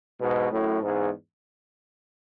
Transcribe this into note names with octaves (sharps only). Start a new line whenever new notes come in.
G#2 B2
F#2 A2
E2 G#2